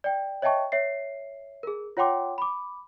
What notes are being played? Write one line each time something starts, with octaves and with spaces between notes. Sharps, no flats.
D5 G5
C#5 D#5 E5 G5 A5 C#6
C#5 E5 C7
G#4 A#4
F4 C#5 F#5 G5 C6 D6
B5 D6